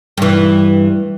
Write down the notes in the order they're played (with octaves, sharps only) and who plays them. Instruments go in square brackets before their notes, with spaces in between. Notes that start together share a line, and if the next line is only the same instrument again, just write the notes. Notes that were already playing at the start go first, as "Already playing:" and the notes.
[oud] G2 E3